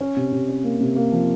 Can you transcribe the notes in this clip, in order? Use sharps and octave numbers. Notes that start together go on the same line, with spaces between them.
C#4
C3
C3
C#4
A#3
C3
A#3
F3